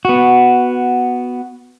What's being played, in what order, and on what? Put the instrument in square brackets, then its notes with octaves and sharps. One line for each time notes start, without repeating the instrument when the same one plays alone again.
[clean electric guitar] B3 F#4